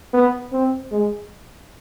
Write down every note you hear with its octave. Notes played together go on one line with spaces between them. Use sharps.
B3
C4
G#3